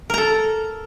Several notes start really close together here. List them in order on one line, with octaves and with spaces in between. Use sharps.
A#4 A#5 A4